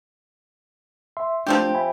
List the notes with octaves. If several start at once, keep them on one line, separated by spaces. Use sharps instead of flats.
E5 C6
F3 A3 C4 D4 G4
E5 G#5 B5